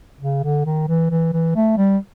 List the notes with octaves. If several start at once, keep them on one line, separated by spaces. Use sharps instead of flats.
C#3
D3
D#3
E3
E3
E3
A3
G3